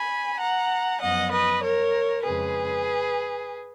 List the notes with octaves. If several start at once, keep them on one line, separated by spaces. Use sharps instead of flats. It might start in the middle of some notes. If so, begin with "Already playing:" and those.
Already playing: G#5 B5
F#5 A#5
F#2 F3 B3 D#5 F#5
B4 D#5
A#4 C#5
F2 C#3 G#3 G#4 B4